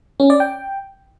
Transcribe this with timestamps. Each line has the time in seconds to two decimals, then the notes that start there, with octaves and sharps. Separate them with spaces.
0.20 C#4
0.30 D5
0.40 G5